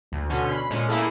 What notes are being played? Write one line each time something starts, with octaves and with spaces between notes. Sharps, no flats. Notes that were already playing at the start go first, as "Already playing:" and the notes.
D2
B2 D3 C#4 C6
B5
A#2 G#3 C#4
A3 A#3 E4 G#4 A4